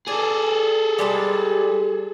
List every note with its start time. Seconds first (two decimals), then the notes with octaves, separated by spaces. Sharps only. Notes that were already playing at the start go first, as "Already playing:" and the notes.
0.08 G#4 A4 D5
0.99 G3 G#3 A5